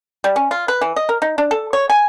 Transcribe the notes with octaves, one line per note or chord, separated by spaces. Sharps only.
G3
C#4
F4
B4
E3
D#5
A#4
D#4
D4
A4
C#5
G#5